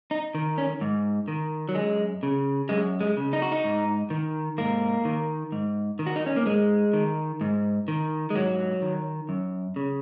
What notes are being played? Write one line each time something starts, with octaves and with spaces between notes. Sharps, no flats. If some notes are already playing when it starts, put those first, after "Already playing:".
D#4
D#3
C#4
G#2
D#3
F#3
F#2 G#3
C#3
F#2 G#3
G#3
C#3
D#4
F#4
D#4
G#2
D#3
G#2 A#3
D#3
G#2
D#3
F#4
D#4
C#4
A#3
G#2 G#3
D#3
G#2
D#3
G#3
G#2 F#3
D#3
F#2
C#3